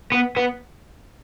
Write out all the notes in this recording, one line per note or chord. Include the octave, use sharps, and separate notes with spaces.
B3
B3